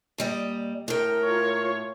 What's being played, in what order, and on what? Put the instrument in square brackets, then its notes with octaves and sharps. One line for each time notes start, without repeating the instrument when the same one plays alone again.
[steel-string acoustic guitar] A#2 G3 D#5
[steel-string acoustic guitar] A2 G5 [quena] A#4
[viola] F4 C#5